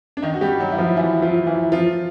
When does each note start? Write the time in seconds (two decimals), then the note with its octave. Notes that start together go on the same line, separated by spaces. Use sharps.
0.17 D4
0.22 D#3 D#4
0.34 F#4
0.41 G3 G4
0.60 F#3 F#4
0.72 E4
0.78 F3 F4
0.97 E3 E4
1.22 F3 F4
1.47 E3 E4
1.72 F3 F4